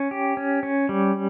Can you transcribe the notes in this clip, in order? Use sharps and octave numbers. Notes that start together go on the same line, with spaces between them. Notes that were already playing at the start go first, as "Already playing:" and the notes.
Already playing: C#4
G4
C#4
C#4
G3